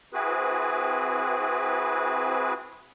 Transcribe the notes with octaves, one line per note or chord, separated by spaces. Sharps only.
C4 E4 F#4 G#4 B4